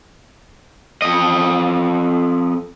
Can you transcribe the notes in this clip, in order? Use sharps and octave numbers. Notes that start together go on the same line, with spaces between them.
F2 D#5